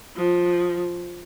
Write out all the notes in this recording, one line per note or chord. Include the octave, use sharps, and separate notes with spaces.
F3